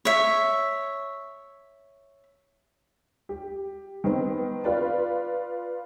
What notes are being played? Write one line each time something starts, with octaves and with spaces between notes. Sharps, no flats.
C#5 E5
G4
D#3 B3 C4
F4 B4 D5